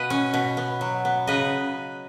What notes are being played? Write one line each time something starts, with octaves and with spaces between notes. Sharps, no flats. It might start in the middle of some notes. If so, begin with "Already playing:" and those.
Already playing: B2 B4 D#5 F5
C#4
B2
B3
F#3
B3
C#3 B4 D#5